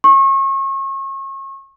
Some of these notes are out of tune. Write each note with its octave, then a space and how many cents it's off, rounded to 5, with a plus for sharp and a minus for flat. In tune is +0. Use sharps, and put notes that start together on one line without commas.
C#6 -35